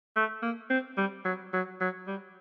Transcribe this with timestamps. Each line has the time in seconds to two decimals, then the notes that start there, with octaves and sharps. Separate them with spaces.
0.16 A3
0.42 A#3
0.70 C4
0.97 G3
1.25 F#3
1.53 F#3
1.81 F#3
2.07 G3